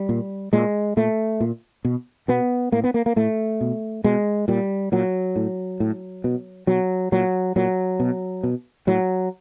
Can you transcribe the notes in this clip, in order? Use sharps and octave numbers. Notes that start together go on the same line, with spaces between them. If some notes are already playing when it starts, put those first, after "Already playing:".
Already playing: G3
A#2
A#2 G#3
A#2 A3
A#2
B2
B2 B3
A2 A#3
B3
A#3
A#3
A2 A3
B2
B2 G#3
A#2 G3
A#2 F#3
A2
A2
B2
B2 F#3
A#2 F#3
A#2 F#3
B2
B2
A2 F#3